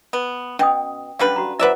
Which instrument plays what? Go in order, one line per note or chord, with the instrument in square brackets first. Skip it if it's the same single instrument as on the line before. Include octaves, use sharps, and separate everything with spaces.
[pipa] B3
[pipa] B2 [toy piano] C#4 G5 D#6
[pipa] D3 G3 B4 [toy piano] C#4 F5
[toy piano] F#4 A#5
[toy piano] E4 C5 F#5 [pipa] B4 D5 E5